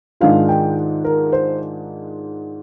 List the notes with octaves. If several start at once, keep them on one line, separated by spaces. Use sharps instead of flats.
G#2 D#3 G#3 D4 F4 F5
G5
A#4
C5